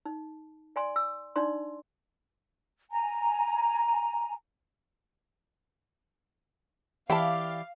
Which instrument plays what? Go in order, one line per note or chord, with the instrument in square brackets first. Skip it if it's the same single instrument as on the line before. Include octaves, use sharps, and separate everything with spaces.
[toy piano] D#4
D5 G#5 C6
E6
D4 D#4 D5 C6
[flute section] G#5 A#5
[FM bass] E3 [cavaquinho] E4 G4 D5 [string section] F5 [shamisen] G5 A5